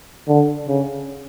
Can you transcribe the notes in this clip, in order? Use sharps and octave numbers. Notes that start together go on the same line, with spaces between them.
D3
C#3